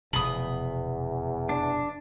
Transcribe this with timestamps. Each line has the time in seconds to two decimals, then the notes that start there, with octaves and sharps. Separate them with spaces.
0.13 F1 E2 B2 B5 D#6
1.49 D4